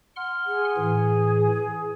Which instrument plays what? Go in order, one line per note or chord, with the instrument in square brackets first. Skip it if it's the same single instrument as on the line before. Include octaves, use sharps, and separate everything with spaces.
[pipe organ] F#5 C6 F6
[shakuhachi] G#4
[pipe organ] A2 E3